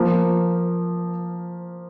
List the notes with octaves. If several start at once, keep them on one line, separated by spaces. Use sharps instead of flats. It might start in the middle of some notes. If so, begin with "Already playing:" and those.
Already playing: F3 A#3